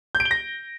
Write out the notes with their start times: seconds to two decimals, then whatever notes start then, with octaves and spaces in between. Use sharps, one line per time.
0.15 G6
0.20 D7
0.25 G7
0.31 A#6